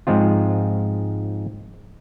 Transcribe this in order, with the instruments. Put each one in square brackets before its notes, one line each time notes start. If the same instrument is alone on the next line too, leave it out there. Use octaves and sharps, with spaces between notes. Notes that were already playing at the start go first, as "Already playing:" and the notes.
[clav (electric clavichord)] G#2 F3 G#3 C4 F4